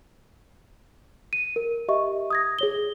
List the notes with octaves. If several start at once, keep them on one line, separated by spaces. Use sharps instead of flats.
D#7
A#4
G4 D#5 E5 C#6
D#6 G#6 A#6
G#4 C#5 G7